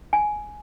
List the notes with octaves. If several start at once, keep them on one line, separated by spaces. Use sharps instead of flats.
G#5